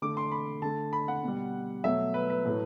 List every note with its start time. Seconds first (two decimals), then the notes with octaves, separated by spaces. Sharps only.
0.02 D3 A3 D6
0.17 C6
0.32 B5
0.62 D3 A3 A5
0.93 B5
1.08 F#5
1.23 B2 G3
1.84 B2 F#3 A3 E5
2.14 B4
2.30 B4
2.45 A2 F#3 A3